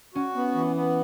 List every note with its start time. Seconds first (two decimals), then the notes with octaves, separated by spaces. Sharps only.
0.14 C#4 F#4
0.35 B3
0.55 E3
0.76 B3